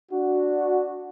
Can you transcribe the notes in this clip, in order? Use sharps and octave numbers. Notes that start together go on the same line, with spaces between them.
D4 F#4